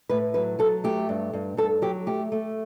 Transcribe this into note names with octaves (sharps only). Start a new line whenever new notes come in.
A2 B4
F#3 B4
F#3 A4
A3 G4
G2
G2
G2 A4
F#3 G4
A3 G4
A3